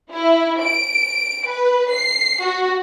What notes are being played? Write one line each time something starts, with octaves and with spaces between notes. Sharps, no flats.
E4
D7
B4
C7
F#4